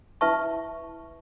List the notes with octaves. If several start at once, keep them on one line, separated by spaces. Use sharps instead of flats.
E4 B4 E5 A5 C#6